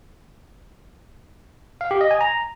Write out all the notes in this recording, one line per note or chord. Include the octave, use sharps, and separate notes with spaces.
F5
G4
D#5
G#5
A#5